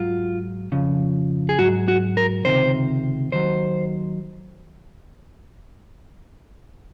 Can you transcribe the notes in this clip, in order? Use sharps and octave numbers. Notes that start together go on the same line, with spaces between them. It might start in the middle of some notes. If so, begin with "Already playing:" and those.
Already playing: G#2 F#3 F4
F2 C#3 F3
G#4
G#2 F#3 F#4
F#4
A#4
C#2 C3 D#3 C5
D#2 D#3 F#3 C5